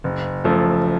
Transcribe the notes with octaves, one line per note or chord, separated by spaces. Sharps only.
F#1
F#2 F3 A3